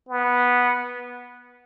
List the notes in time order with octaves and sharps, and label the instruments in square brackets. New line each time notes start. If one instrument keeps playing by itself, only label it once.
[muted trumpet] B3